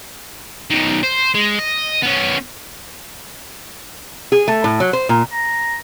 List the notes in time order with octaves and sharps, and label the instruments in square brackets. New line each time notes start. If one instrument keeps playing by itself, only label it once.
[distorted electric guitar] B1 D#3
C5
G#3
D#5
B3 C#4
[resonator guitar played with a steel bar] G#4
A3
A2
F#3
C5
A#2
[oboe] A#5